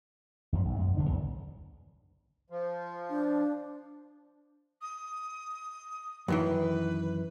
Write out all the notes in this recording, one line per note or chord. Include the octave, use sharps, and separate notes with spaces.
G#1 F#2 F3
B1 G#2
F#2 G#3
E1 D3 D4
A#1 E2 A2
F3
D4
D#6
F#2 D#3 E3 B4